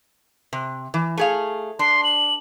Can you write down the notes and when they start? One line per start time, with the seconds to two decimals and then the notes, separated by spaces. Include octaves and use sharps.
0.53 C3
0.94 E3
1.17 A3 G#4 F5
1.79 D4 C6
2.04 F#7